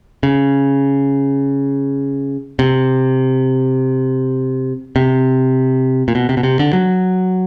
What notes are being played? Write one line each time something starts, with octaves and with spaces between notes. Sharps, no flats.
C#3
C3
C3
A#2
B2
C3
B2
C3
D3
F#3